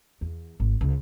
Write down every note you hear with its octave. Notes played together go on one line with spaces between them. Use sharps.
E2
G#1
C#2